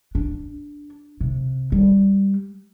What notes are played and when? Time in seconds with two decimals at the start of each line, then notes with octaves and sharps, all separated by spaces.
0.15 D4
1.21 C3
1.72 G3